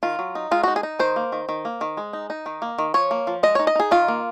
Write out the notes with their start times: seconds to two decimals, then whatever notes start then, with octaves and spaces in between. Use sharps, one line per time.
0.03 D#3 F4
0.19 F#3
0.35 D#4
0.51 G#3 F4
0.63 D#4 F#4
0.76 G#4
0.83 D#4
0.99 D#3 C5
1.16 A#3
1.32 D#3
1.49 D#3
1.65 A#3
1.81 D#3
1.97 G#3
2.13 D#4
2.30 D#4
2.46 D#3
2.62 A#3
2.78 D#3
2.94 F3 C#5
3.11 A#3
3.27 F3
3.43 G#3 D#5
3.55 D#4 C#5
3.67 D#5
3.75 D#4 G#4
3.91 D#3 F4
4.08 A#3